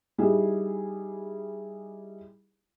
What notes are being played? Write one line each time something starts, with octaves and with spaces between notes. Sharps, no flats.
G3 D#4 E4 G#4